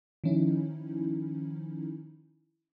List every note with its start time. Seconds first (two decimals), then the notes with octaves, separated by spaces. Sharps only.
0.24 D#3 F3 C#4 D#4 E4